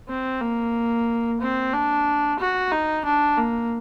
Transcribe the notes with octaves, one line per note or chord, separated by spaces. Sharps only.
C4
A#3
C4
D4
F#4
D#4
D4
A#3